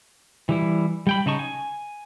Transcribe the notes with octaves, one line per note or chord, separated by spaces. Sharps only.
E3 G3 E4
G3 G5 B5
C#3 D#4 A5 C#6
G#5